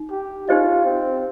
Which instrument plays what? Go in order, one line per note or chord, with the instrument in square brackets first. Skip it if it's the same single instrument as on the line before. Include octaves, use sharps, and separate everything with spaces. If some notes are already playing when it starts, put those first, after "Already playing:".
Already playing: [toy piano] D#4
[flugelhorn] G4
[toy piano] D#4 G4 C5 D#5 [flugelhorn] F4
[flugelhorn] C4